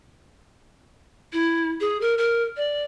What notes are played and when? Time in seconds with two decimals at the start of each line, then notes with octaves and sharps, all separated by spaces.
1.33 E4
1.80 G#4
2.01 A#4
2.18 A#4
2.57 D5